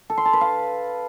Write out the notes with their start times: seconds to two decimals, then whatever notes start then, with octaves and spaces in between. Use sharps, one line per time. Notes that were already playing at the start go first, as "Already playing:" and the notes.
0.10 A4
0.17 C6
0.25 A5
0.33 B4
0.41 F5